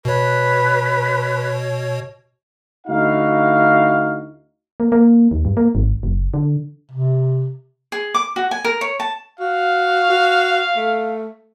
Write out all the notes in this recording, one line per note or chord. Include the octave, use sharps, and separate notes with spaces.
B2 B4 C#5
D2 D#4 E4 F#4 F5
A#3
A#3
D#2
G2
A#3
G#1
F#1
D3
C3
G#4
D6
F#4
G#5
A#4
C#5
A5
F#4 F5
F#4
A3